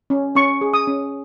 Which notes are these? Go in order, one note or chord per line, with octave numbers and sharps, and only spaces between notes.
C#4
C#4 C#6
G#4
D#6
C#4